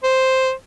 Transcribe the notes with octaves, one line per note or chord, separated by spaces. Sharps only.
C5